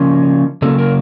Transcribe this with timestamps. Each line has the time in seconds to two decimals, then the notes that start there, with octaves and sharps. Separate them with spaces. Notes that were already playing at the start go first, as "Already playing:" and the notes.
Already playing: C#3 F3 A#3 C#4
0.62 C#3 F#3 A#3 A4
0.78 A#4